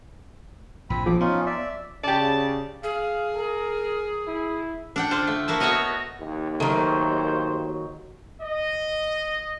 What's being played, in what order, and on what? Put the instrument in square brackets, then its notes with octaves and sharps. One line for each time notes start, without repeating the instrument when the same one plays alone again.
[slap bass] A#1 A#2 [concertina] C4 B5
[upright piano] F3 [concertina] D6
[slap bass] B3 [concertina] C#4 D#4 F4
[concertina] D5 E5
[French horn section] C#3 [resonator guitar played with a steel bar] G4 D5 [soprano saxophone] A5
[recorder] G#4 [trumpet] F5
[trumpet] A#4
E4
[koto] D4 F#5 G5
D3 D4 F4 C5
A3
A#3 E4 F#4 A5
A3 B3 F#4 A#4 C#5 D#5
[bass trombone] D#2
[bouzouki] D#3 F#3 [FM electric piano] A3 A#4 [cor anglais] C5
[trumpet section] D#5